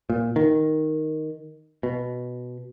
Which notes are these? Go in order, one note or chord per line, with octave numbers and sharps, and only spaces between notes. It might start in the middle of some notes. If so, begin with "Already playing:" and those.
A#2
D#3
B2